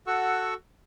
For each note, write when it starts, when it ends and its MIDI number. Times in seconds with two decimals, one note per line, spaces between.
0.07 0.54 66
0.07 0.54 69
0.07 0.54 78
0.07 0.54 85
0.07 0.54 88